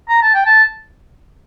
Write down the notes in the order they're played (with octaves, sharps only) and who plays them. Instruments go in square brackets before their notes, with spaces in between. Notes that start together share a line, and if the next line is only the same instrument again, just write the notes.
[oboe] A#5
A5
G5
A5